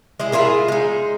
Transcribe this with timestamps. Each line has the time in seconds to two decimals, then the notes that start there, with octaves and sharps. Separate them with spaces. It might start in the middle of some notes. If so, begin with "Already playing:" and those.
0.20 G#3 E4 G#4
0.32 E4 F4 G#4 A#4
0.68 G#3 D#4